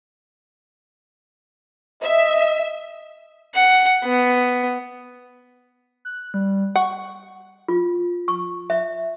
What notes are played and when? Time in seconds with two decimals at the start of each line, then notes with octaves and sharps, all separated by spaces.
2.03 D#5 E5
3.55 F#5
4.04 B3
6.05 F#6
6.34 G3
6.76 F#5 C#6
7.68 F4
8.28 C#6
8.70 E5